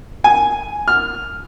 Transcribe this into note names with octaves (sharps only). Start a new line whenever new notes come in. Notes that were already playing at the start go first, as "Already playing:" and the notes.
G#5
F6